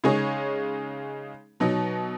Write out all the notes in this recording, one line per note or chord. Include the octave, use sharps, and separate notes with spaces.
C#3 G#3 D#4 G#4 C#5
B2 F#3 D#4